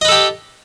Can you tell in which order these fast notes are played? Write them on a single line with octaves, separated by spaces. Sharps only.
D#5 B4 A4 G4